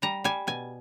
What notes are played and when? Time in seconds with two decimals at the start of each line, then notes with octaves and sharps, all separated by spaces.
0.02 G3 A#5
0.24 G3 G#5
0.47 B2 G#5